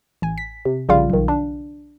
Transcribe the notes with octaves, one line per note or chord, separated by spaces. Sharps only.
A1 G#5
B6
C3
A#1 C#3 G3 F4 F5
B1 D#3
D4